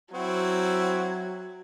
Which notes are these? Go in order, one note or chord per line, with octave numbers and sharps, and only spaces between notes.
F#3 C4 E4 F#4